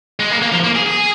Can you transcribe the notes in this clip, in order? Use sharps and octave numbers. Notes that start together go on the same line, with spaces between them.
G#3
A#3
A#3
F3
A#3
G#4
G#4